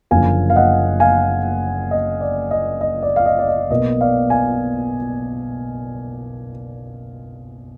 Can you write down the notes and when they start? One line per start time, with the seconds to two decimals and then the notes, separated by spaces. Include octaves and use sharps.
0.11 F#1 F#2 D3 F3 A#3 F5 G#5
0.50 F5
0.56 D#5 F#5
1.00 F5 G#5
1.91 D#5
2.21 D5
2.51 D#5
2.81 D#5
3.02 D5
3.16 F5
3.26 D#5
3.39 D5
3.48 D#5
3.70 B1 B2 A#3 D#5
4.01 D5 F5
4.30 F5 G#5